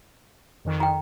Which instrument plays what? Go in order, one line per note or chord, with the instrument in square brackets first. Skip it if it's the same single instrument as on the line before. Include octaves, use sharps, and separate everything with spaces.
[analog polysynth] F2 D#3
[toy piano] G5 A#5